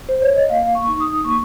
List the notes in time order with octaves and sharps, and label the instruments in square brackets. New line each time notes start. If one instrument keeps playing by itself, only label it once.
[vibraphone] C5
C#5
D#5
A#3 F5
C#6
D#4
D#6
A#3 C#6